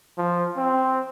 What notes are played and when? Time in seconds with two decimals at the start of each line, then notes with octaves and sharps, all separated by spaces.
0.18 F3
0.57 C4